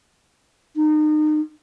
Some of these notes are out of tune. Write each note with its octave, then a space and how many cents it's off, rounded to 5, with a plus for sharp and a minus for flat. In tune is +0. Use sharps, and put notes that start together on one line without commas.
D#4 -30